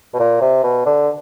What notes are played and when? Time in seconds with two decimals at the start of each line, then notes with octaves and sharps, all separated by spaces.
0.14 B2
0.19 A#2
0.41 C3
0.63 B2
0.86 D3